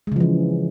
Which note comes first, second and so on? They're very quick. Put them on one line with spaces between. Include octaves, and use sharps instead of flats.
G#3 C#3 F3 E3